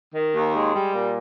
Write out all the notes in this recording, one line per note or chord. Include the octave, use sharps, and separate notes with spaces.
D#3
D#2
G#3
G3
A#2